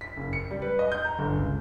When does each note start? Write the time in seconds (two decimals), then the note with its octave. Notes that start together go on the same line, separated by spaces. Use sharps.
0.01 B6
0.17 F#1
0.33 C#7
0.51 G3
0.62 B4
0.79 D#5
0.92 G6
1.05 A#5
1.19 G1
1.37 C#2